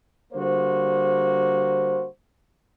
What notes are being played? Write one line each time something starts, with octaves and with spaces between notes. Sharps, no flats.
D3 G3 A#3 F#4 C5